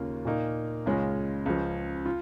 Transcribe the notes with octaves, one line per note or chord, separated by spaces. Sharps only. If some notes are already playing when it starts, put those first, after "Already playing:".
Already playing: D#2 C#3 A#3 C#4 F4
A#2 A#3 D#4
C#2 C#3 G#3 C#4 F4
C#2 C#3 F3
F4